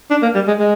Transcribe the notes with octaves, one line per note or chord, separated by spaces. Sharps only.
D4
A#3
G3
G#3
G#3